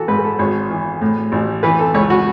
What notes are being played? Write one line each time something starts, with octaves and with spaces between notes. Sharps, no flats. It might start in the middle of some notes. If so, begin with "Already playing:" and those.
Already playing: E3 F#4 A4
G#2 B4
B4
A4
G#1 C#5
E3
A2
A1
E3 B4
A4
C#2 C#5
F#4